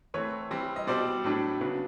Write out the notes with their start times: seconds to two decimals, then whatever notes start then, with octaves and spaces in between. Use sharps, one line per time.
0.14 E3 A3 C4 B4 C#5
0.51 E3 G3 C4
0.76 D#5
0.87 B2 G3 C4 C5 D5
1.24 A2 F#3 A3 D4
1.61 C#3 F#3 B3 D4